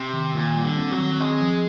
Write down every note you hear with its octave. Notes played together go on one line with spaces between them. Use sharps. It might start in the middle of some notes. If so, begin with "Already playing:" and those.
Already playing: C3 C4
D#3
A#2 D#3
G3
D3
C4
F#3
D#3
G#3 C4
F3